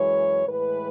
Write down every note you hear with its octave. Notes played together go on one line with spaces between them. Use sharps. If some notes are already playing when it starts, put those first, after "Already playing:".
Already playing: F#2 E3 G#3 C#5
A2 E3 G#3 B4